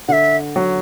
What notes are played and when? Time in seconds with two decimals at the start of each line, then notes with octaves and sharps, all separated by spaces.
0.08 D3 E5 F#5
0.56 F#3